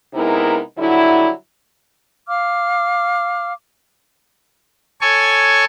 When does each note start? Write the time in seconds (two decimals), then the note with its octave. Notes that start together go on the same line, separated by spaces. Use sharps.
0.14 C3 G#3 B3 D#4 E4 A#4
0.78 D3 F#3 G3 E4
2.28 F5 D6 F6
5.01 A4 C#5 G#5 C#6